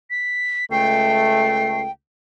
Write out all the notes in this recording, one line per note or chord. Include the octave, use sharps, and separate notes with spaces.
B6
C#2 A3 G5 C7